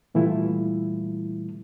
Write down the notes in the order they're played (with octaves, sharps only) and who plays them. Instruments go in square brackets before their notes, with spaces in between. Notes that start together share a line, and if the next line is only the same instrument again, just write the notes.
[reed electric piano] A#2 E3 G3 A3 E4 F4